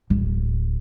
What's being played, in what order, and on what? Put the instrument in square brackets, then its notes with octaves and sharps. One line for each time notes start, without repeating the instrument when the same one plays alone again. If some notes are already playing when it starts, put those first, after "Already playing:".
[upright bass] D1